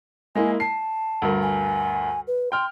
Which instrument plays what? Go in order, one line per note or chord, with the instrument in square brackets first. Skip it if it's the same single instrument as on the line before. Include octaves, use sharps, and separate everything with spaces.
[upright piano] G#3 A#3 E4 [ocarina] G#5
[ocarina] A5 [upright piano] C7
[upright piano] D2 G2 A#4
[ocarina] G#5
B4
[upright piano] G5 F6 [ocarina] C6